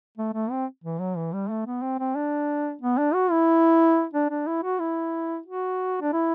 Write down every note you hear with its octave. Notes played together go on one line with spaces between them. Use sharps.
A3
A3
C4
E3
F#3
E3
G3
A3
B3
C4
C4
D4
B3
D4
F#4
E4
D4
D4
E4
F#4
E4
F#4
D4
E4